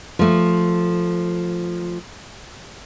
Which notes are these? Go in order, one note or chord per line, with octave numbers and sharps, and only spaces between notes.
F3 A3